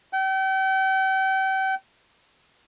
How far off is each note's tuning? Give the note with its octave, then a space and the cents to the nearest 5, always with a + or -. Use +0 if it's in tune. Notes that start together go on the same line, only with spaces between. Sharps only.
G5 -40